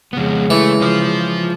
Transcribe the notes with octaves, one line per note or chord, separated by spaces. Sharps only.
F2 C#3 G#3 B3
E3 A3
F3 C5